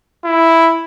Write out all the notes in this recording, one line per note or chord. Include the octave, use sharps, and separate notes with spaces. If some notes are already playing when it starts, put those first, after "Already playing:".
E4